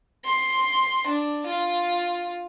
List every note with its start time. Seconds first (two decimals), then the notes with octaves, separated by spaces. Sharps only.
0.25 C6
1.07 D4
1.47 F4